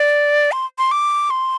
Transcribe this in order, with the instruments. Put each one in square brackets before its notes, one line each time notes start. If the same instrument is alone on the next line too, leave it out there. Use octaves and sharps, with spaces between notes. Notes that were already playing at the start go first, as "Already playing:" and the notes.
Already playing: [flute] D5
C6
C6
D6
C6